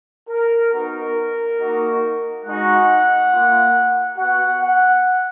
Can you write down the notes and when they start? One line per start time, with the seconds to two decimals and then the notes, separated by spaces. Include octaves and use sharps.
0.29 A#4
0.72 B3 D#4 F#4 A#4
1.59 A#3 D#4 F#4
2.45 G#3 D#4 F#4 F#5
3.31 A#3 F4
4.17 B3 F#4 F#5
4.61 F#5